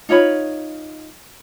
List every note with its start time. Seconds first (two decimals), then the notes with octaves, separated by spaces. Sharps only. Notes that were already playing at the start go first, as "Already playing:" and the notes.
0.09 D#4 F4 C#5 B5